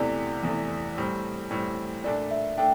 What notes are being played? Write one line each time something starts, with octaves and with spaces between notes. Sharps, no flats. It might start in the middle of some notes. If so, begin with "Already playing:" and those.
Already playing: E2 C3 E3 A3 D5
E2 C3 E3 A3
A2 G3 C4
A2 G3 C4
A#2 A3 D4 D5
E5
A3 D4 G5